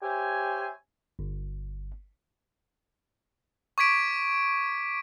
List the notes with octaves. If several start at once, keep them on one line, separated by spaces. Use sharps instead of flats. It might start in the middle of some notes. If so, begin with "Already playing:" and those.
G4 C5 C#5 E5 G#5
G1
C#6 D6 G#6 B6 D7